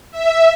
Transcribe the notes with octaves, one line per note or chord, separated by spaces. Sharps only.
E5